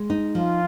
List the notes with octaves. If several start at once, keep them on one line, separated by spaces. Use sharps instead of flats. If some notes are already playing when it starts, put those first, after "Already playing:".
Already playing: G#3
D#4
F3 F4